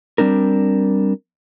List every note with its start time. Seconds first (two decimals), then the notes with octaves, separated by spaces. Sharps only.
0.18 G3 C4 D4 A#4